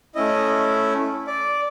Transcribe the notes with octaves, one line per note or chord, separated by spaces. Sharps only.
A3 C#4 E4 D#5
D5